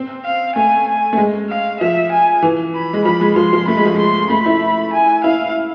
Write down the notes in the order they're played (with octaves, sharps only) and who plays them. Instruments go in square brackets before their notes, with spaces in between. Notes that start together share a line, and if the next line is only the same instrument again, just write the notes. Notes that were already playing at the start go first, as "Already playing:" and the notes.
Already playing: [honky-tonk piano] C4
[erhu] F5
[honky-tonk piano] A3 [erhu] G#5
[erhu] G#5
[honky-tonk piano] A3
G#3
[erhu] F5
[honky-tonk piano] F3 [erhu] E5
[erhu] G#5
[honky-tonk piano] E3
[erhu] B5
[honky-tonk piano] G#3
[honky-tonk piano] F3 [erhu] B5
[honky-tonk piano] G#3
[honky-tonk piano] F3 [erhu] C6
[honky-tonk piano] F3
[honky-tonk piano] A3 [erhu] B5
[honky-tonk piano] G#3
F3
G#3
[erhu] C6
[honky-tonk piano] A3 [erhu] B5
[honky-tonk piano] E4
[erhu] G#5
[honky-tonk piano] E4 [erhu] F5